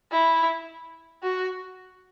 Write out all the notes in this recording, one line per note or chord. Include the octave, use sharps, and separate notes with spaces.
E4
F#4